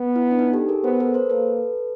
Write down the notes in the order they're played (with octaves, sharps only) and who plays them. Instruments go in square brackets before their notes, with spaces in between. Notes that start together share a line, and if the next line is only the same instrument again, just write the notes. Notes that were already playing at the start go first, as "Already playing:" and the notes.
Already playing: [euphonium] B3
[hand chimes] E4
D4
D#4
G4 A4
G#4 A#4
[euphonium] B3 [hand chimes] A#4 C5
[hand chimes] A4 B4
A#4 C5
[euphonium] A#3 [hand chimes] A4 B4